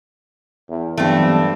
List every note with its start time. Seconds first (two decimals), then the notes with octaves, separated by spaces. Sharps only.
0.69 E2
0.97 G2 E3 F#3 A3 B3 C4